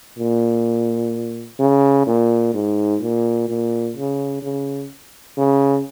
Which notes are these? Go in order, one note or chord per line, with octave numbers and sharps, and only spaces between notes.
A#2
C#3
A#2
G#2
A#2
A#2
C#3
C#3
C#3